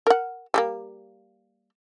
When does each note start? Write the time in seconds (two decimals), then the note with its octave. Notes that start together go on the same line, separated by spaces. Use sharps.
0.07 A#4 F#5
0.54 G3 G#3 A#3